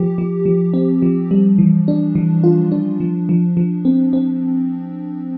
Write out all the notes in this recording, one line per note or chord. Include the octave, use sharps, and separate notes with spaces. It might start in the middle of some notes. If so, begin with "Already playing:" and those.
Already playing: F3 G4
F3
F3
C4
F3
G3
E3
D4
E3
F4
D4
F3
F3
F3
C4
C4